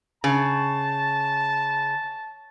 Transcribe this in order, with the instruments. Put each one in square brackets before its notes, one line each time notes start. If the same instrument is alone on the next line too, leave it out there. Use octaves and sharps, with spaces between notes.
[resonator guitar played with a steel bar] C#3 [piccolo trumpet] A5